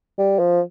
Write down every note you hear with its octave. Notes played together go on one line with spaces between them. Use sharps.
G3
F3